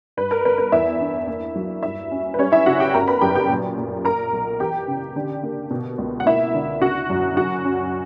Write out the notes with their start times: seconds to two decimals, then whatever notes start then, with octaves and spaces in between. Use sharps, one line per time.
0.17 G2 B4
0.31 A#4
0.45 G1 B4
0.58 B4
0.72 E2 E4 E5
1.01 D4
1.27 A#3
1.55 F#3
1.83 G2 E4 E5
2.11 C#4
2.34 B4
2.39 G3 C#4 C#5
2.52 E4 E5
2.66 C#3 F#4 F#5
2.80 G4 G5
2.94 G1 A#4 A#5
3.08 B4 B5
3.21 F#2 G4 G5
3.35 G4 G5
3.49 A#2
3.78 A#2
4.04 A#3 A#4 A#5
4.33 B1
4.60 E3 G4 G5
4.87 C#3
5.16 D3
5.43 A#3
5.71 B2
5.98 C#2
6.20 F#5
6.26 A#3 E4 E5
6.54 D3
6.82 C#3 F#4 F#5
7.10 F#2
7.37 C#4 F#4 F#5
7.65 C#4